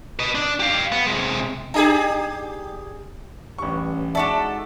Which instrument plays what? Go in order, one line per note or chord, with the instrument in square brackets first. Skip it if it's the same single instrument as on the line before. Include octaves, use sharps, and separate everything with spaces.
[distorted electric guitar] B4 D#5
D4
G4 F5
B3
C3 G#3
[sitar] D4 G4 G#4
[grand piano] A1 C#6 [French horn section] G2 C#4 G4
[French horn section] G#3 D#4 [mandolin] D4 F#4 A4 [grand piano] D5 A5 [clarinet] E5